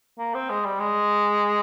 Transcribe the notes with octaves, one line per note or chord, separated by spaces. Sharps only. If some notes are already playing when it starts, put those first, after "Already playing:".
A#3
C4
G#3
G3
G#3